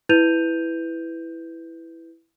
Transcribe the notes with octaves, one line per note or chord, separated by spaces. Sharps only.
E4 B4 G6 D#7 F7